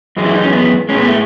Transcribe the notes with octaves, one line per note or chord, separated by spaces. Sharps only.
F#2 E3 G#3
E4
D#4
C#4
B3
A2 G#3 C#4
B3
A3